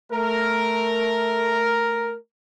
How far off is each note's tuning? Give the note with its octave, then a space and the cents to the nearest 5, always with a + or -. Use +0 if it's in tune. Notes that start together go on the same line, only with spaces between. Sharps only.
A3 +0 A#4 +0